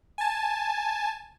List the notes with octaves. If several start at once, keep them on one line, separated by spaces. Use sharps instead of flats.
G#5 A5